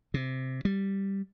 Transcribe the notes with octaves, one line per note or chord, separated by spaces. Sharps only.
C3
G3